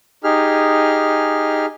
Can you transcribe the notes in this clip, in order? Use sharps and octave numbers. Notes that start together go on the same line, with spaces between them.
D#4 G4 G#4 F6